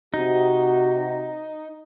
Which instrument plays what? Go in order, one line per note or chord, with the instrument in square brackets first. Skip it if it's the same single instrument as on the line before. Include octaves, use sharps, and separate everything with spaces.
[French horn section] C3 F#4 [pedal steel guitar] D#4